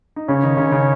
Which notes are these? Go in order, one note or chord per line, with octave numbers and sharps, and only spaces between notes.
D#4
C#3 C#4 C#5
D#3 D#4
C#3 C#4
C#3 C#4